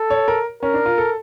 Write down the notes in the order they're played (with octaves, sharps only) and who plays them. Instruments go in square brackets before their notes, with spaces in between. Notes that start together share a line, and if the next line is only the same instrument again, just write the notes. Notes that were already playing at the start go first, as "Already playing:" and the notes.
Already playing: [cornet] A4
[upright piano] C#5
A#4
[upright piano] C#4 [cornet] A#4
[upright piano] D4
F4
A4